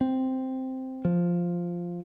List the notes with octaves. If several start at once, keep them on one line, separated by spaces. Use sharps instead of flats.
C4
F3